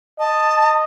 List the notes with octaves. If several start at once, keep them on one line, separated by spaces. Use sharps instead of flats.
D#5 A5